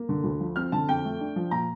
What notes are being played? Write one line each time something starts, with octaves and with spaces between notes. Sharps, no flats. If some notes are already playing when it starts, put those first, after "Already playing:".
Already playing: A#3
D3
D2
F3
C4 F6
D3 A5
F2 G5
A3
D4
F3
A#2 A#5